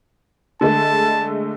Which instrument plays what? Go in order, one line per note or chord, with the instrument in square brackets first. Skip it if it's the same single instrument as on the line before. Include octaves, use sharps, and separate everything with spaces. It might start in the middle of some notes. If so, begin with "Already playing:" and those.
[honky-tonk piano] D3 G#3 A3 [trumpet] A5